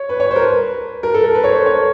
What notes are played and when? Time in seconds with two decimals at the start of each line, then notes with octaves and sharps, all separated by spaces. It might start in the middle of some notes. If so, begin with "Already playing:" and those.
Already playing: C#5
0.09 B4
0.20 C#5
0.31 C5
0.36 A#4
0.41 B4
1.03 A#4
1.14 A4
1.24 A#4
1.34 B4
1.44 C#5
1.50 C5
1.66 C#5